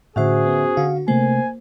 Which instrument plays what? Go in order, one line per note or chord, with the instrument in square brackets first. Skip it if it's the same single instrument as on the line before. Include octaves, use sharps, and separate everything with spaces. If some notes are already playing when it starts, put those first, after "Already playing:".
[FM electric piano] A2 [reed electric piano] D3 E5 F#5 [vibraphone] C#4 F#4 C5 [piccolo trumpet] G#4
[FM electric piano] B3
[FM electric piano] D3 F#4 [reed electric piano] F5
[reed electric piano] C3 A3 [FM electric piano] A#3 [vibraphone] C5 [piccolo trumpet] G#5